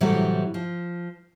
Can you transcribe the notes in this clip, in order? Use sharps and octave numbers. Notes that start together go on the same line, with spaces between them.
A2 C3 E3 F#3 G3 A3
F3